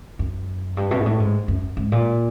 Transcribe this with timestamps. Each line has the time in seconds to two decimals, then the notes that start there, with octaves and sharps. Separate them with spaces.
0.19 F#2
0.77 G2
0.91 B2
1.01 G#2
1.06 A2
1.20 G#2
1.48 F#2
1.77 G#2
1.92 A#2